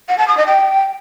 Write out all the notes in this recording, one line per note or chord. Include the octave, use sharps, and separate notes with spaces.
F#5
A5
D#6
D#5
G5